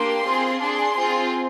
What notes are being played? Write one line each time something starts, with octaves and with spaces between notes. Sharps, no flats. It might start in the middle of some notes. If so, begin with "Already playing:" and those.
Already playing: A#3 D4 G4 C6
C4 F4 G#4
D4 G#4 C6
C4 F4 G#4